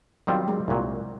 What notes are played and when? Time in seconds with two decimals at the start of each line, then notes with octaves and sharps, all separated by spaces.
0.27 D#3 F#3 G3 C4 F4
0.48 G#3
0.68 C2 A#2 F#3